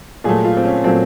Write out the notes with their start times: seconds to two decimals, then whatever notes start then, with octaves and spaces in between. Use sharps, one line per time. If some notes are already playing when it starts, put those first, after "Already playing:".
0.24 A#2 F#3 A3 G#4
0.45 F4
0.57 C4
0.65 C#4
0.84 A#2 F#3 A3 C4